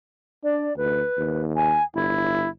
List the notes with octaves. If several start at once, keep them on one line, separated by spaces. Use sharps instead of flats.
D4 D5
D2 B4
D#2
G#5
G1 E4